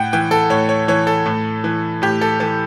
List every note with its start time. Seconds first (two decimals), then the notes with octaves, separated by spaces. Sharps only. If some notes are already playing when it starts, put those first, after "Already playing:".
Already playing: A2 F#5 G5
0.13 E3 G5
0.31 A4
0.50 A2 C#5
0.69 C#5
0.88 E3 C#5
1.07 A4
1.26 A2
1.64 E3
2.02 A2 G4
2.21 A4
2.40 E3 A4